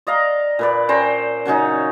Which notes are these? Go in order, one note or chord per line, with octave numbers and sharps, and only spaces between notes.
D5 D#5 F5 A#5
A#2 B4 D5
C#4 C5 G5 A#5
C#3 F#3 C#4 D#4